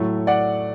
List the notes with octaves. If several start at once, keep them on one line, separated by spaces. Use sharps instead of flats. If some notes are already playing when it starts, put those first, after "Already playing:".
Already playing: A2 F#3 A3
D5 F#5